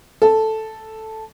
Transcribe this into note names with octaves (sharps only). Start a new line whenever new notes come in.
A4